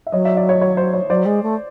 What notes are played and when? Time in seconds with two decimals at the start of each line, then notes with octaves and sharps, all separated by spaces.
0.07 E5
0.12 F#3 C#5 D#5
0.25 D5 E5
0.37 D5 E5
0.49 C#5 D#5
0.61 C#5
0.77 C5
0.94 C#5
1.10 F#3 C5 D5
1.26 G#3
1.43 A3